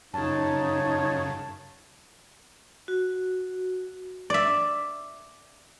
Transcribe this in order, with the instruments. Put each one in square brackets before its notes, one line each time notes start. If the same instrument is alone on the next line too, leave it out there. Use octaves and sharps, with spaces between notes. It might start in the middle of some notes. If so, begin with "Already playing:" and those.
[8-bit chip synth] F#2 C#3 [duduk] D#4 [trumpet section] F4 C#5 [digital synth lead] A5
[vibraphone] F#4
[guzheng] D5 E5